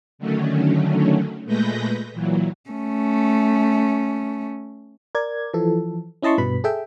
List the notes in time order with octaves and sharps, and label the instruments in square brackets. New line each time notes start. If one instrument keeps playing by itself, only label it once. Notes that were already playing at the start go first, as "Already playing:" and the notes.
[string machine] D3 D#3 F#3 A3 C#4
A#2 G#3 A3 B4 G6 A#6
A#2 E3 F#3
[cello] A3 C#4
[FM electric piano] A#4 D5 G#6
E3 F3 A4
C#4 E4 D#5 A5 C6 C#6
G2 B2 B4 B5
G#4 A4 E5 G5